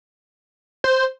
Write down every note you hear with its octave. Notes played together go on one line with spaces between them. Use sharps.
C5